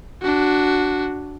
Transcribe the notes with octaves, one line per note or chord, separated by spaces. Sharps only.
D4 F#4